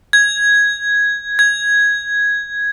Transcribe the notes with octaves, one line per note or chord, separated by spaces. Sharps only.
G#6
G#6